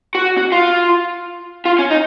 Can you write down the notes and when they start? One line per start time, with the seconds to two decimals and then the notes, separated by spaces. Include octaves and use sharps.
0.15 F#4
0.37 F#4
0.52 F4
1.65 F4
1.79 C#4
1.90 D#4